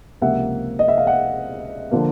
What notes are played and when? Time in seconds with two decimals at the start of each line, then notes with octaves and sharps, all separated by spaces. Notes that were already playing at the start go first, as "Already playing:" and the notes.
0.21 C#2 C3 F3 A#3 E5 F#5
0.79 D#5
0.88 E5
0.98 F5
1.07 E5 F#5
1.91 D3 F3 A#3